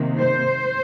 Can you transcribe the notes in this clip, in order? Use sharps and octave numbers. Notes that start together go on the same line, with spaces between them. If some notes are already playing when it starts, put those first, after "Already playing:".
Already playing: C3 D#3 A#3
C5